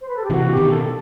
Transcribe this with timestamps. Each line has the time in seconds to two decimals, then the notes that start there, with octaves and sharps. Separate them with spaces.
0.01 C5
0.08 B4
0.16 A4
0.23 G4
0.30 C3 E3 F#4
0.50 G4
0.57 B2 D#3
0.70 A4
0.82 A4